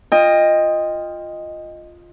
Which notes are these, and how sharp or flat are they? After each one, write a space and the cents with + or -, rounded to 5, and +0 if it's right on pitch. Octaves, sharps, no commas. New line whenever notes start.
F4 +0 D#5 +0 G5 +30